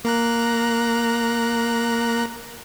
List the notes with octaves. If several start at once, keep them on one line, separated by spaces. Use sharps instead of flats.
A#3 A#5 F#6